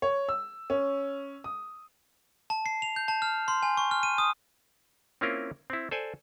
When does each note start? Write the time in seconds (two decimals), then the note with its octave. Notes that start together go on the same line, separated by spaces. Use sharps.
0.02 C#5
0.29 E6
0.70 C#4
1.44 D#6
2.50 A5
2.66 C7
2.82 F7
2.96 G6
3.08 A5
3.22 F6
3.48 C6
3.63 G#5
3.77 C#6
3.91 F6
4.03 D#7
4.18 D#6
5.21 A#3 C4 C#4 E4 F4 A#4
5.70 C4 E4
5.91 A4 C5 D5 G#5